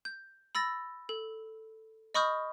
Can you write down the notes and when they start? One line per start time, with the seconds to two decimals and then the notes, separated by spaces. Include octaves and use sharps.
0.05 G6
0.55 B5 E6 A6 A#6
1.09 A4
2.14 D#5 B5 C#6 D#6 F6 G6